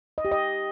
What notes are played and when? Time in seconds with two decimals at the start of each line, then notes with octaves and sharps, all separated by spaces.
0.18 D#5
0.25 G4
0.32 D#5